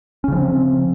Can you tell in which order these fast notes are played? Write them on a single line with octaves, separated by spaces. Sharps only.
C#4 C#3 F3 C4